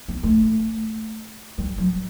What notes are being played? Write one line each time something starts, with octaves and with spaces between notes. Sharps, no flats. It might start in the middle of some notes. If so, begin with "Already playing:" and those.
B3
A3
G3
F#3